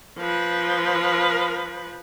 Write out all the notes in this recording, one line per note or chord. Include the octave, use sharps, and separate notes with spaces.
F3 B4